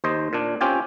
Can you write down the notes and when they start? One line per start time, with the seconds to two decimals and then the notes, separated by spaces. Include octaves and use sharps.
0.04 D#2 C5 D#5
0.33 A#2 D4
0.61 C4 C#4 F4 G4 G5 G#5